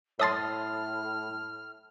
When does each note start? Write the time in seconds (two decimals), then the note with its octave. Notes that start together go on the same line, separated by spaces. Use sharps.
0.20 A2 C#5 E5 A5 C6 D#6 F6 A6